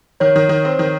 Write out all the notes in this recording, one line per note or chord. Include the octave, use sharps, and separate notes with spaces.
D#3 C#5
D#3
D#3
C4
D#3